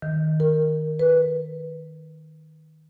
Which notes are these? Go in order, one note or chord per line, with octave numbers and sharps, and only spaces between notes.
D#3
A#4
B4